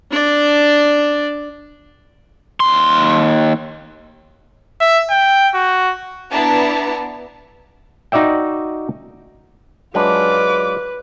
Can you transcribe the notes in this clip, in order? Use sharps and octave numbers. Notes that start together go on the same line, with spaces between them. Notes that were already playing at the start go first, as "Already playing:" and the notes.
D4 D5
D#2 C6
E5
G5
F#4
B3 D4 E4 A5 A#5
D#4 F#4 D5 E5 G5
F#3 G#3 D4 F4 B4 D6